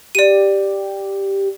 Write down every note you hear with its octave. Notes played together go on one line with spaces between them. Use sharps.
G4 D5 D#7